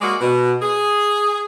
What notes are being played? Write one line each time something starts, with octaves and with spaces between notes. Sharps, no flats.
G#3 A#3 F#4 G#4 D5
B2
G#4